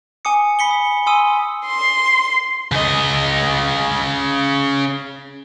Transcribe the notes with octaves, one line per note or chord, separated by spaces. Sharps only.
G#5 D6 D#6 C#7
B5 B6 C#7 G7
D#6
G#5 C6 D#6 E6 D#7
C6
C#3 D#5